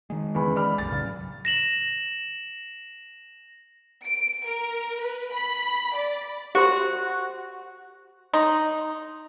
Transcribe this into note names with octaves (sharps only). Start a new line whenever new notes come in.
D#3 G#3
E2 C#3 B5
D5 B5 F6
B1 F#2 A6
A2 C#3 F#3
A#6 E7 F#7
D7
A#4
B4
B5
D5
F#4 G4 C5 C6
D#4 C6